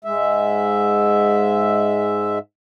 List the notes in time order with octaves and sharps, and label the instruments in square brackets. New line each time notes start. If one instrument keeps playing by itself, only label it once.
[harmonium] G#2 G#3 E5